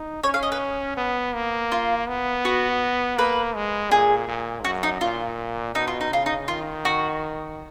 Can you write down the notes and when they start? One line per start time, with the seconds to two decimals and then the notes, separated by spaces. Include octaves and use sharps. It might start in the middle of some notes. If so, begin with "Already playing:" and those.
Already playing: D#4
0.23 C#4 C#5
0.34 F5
0.43 D#5
0.52 B4
0.97 B3
1.34 A#3
1.72 F4
2.08 B3
2.45 F#4
3.18 A#3 B4
3.55 G#3
3.91 A#2 G#4
4.28 A#2
4.64 F#2 F#4
4.83 D#4
5.01 A#2 F4
5.74 B2 D#4
5.87 F4
6.01 D#4
6.11 C#3 F4
6.26 D#4
6.48 D#3 F4
6.85 F#4